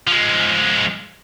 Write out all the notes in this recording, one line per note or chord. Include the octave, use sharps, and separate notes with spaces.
F3 G#3